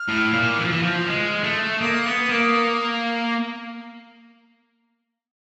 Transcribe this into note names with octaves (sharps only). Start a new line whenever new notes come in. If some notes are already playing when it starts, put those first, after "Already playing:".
Already playing: F6
A2
A#2
E3
F3
E3
F3
G#3
A3
A#3 D#6
B3
A#3